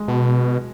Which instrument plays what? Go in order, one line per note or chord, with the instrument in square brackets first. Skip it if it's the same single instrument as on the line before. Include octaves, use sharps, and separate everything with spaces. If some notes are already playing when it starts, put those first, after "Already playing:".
Already playing: [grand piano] G#3
[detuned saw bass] B2